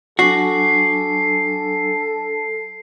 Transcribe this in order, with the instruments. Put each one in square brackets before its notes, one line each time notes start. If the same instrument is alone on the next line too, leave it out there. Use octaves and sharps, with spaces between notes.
[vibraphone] F#3 D4 G#5 [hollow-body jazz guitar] F#4 [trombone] A4 [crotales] C7